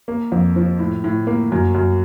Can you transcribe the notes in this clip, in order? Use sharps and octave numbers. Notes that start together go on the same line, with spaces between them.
A#3
F2
F3
A2
A2
A#3
F#2
F#2